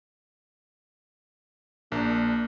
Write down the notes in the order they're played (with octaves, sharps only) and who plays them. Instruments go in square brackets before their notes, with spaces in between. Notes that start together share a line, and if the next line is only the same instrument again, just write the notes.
[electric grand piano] A#1 D4 A#4 [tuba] A#3